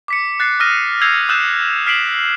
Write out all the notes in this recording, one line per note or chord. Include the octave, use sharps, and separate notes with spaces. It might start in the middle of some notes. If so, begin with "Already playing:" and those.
D6 B6 C#7
F#6 A6 C7
D#6 F6 A#6 D#7
E6 G6 G#6 C7 F7
D#6 E6 F#6 G6 A6 E7
F6 B6 C7 D7 E7 F#7